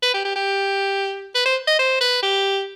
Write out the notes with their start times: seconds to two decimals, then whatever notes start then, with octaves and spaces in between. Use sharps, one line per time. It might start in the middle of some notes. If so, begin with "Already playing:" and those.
0.03 B4
0.14 G4
0.25 G4
0.36 G4
1.35 B4
1.45 C5
1.67 D#5
1.79 C5
2.01 B4
2.22 G4